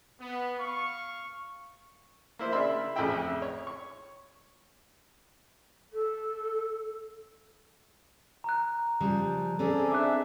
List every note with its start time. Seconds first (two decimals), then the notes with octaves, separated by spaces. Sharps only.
0.21 B3
0.59 F5 C#6
2.39 A#3 E4 C5
2.52 C#3 A#3 D4 E5 B5 C6
2.96 A1 F2 C#3 E4 E5 G5
3.42 C#5
3.67 C#6
5.93 A4
8.44 A#5 F#6
9.00 C#3 F3 G3
9.59 C4 C#4 G#4 A4 D5
9.92 D4 E5 D6 F#6